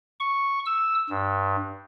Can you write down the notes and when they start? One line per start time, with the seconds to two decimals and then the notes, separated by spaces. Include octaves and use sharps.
0.20 C#6
0.66 E6
1.10 G2